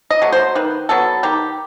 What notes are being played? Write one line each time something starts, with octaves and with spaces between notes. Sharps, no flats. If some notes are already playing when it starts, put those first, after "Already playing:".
D#5
F#3 A3
C5
D#3 B4
F#3 B3 A4
D#3 G4